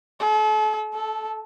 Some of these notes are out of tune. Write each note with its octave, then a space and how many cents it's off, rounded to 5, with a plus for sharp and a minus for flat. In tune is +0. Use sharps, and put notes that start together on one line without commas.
A4 -40
A4 -10